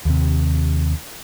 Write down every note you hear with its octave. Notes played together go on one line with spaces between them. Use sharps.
D#2 C3